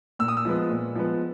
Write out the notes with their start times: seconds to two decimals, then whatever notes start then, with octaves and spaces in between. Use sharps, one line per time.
0.19 A#2 E6
0.28 D#6
0.37 E6
0.45 F3 G#3 B3
0.70 A#2
0.95 F3 G#3 B3